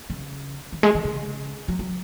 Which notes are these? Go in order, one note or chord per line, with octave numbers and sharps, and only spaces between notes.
C#3
D#3
G#3
D#3
C#3
F#3
F#3